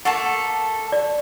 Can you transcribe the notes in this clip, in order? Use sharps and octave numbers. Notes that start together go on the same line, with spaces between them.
A3 A#3 A4 F#5
D5